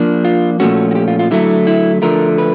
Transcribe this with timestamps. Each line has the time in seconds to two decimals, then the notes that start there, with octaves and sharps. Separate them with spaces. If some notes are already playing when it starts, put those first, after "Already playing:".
Already playing: F3 A#3 D4
0.25 F4
0.60 A#2 F3 A3 C#4 F#4
0.91 F#4
0.95 G4
1.08 F4
1.19 F4
1.31 D3 F#3 A3 E4
1.67 E4
2.02 D3 F3 A3 A#4
2.38 B4